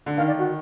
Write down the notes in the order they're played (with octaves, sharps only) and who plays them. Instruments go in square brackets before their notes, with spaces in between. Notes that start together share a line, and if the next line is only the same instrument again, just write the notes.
[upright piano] D3
[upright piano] D#3 [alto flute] F5
[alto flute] D5
F#4